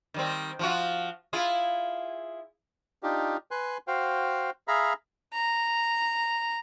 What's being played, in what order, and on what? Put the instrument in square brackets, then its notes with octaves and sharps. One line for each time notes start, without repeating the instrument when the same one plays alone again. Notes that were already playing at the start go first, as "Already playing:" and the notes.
[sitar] D#3 G3 C4
F3 F4 F#4
E4 F4 G#4
[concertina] D4 D#4 F4 G4
B4 G#5 C6 F#6
F#4 C5 F5 G5
G#4 E5 F5 A#5 B5
[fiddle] A#5